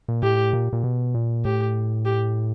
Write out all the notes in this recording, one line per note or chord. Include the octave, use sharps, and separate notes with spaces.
A#2
A2 G4
A#2
A#2
B2
A#2
A2 G4
G4